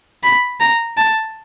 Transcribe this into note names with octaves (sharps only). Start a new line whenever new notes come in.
B5
A#5
A5